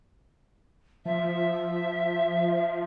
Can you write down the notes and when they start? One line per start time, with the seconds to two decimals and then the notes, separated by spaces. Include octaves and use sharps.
1.05 F3 E5